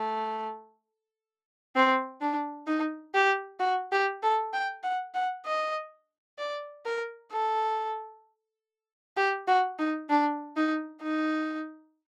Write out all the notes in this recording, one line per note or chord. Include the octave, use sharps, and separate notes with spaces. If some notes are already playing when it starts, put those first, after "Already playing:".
Already playing: A3
C4
D4
D#4
G4
F#4
G4
A4
G5
F#5
F#5
D#5
D5
A#4
A4
G4
F#4
D#4
D4
D#4
D#4